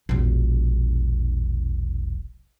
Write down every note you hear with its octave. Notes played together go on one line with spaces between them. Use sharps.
E1 A#1